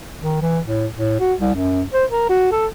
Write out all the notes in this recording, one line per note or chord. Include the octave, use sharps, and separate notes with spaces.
D#3
E3
A2
A2
F#4
C2
F#2
C5
A#4
F#4
A4